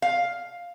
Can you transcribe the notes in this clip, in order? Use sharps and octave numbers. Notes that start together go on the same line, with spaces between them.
F5